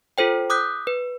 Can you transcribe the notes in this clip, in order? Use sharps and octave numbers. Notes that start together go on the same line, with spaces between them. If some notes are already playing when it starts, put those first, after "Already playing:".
F4 A4 C5 G5
D6 D#6 F#6 G6 B6
B4